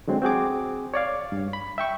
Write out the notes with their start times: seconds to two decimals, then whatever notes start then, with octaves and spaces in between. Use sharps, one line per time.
0.08 D3 F#3 G#3 C4
0.22 C4 F#4 G#4 D6
0.94 C#5 D5 F5
1.32 G2
1.53 B5
1.78 E5 G5 C#6